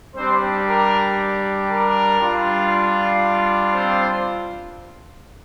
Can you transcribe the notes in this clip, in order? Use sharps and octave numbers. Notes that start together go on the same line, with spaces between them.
G3 C4 D4 G4 C5
A#4
A#4
G3 D4 F4
C4 C5